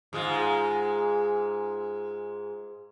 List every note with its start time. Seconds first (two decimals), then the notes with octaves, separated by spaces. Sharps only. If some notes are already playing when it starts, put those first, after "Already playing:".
0.13 G#2 G#3 F4